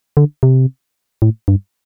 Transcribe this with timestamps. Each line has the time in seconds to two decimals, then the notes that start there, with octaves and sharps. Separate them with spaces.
0.17 D3
0.43 C3
1.22 A2
1.48 G2